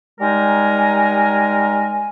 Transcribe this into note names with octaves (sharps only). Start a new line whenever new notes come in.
G3 G#3 D#4 A#4 G#5